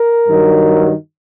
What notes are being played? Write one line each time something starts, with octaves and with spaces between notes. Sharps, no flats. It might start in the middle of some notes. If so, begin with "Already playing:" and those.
Already playing: A#4
G2 D#3 F#3